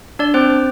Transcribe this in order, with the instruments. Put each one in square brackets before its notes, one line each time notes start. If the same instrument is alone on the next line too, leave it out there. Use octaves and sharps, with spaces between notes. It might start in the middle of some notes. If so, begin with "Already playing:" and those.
[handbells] D4 D5
C4 C5